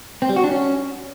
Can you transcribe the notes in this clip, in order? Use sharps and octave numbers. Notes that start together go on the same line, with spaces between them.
C4
G3
F#4
D4
C#4